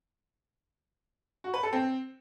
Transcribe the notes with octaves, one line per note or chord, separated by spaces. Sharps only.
F#4
B4
A4
C4